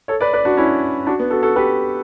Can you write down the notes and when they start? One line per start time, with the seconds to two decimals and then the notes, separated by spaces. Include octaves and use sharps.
0.08 A4 C#5
0.21 B4 D5
0.34 B4 D5
0.45 D4 F#4
0.57 C#4 E4
1.07 D4 F#4
1.19 B3
1.30 F#4 A4
1.43 F#4 A4
1.56 G4 B4